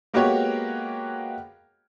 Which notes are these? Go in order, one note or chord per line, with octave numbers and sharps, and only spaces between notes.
G#3 A#3 B3 F#4 G4 C#5